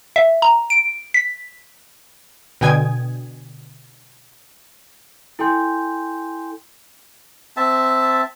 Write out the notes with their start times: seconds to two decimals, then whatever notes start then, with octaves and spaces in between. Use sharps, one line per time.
0.16 E5
0.42 A#5
0.70 D7
1.14 B6
2.61 B2 D3 G5 G#5 D#6 G#6
5.39 E4 A4 G5 G#5 C6 G6
7.57 C4 E5 A5